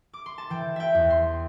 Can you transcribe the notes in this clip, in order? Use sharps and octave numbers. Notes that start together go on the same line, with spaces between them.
D6
C6
A5
E3 G5
E5 G5
E2
C6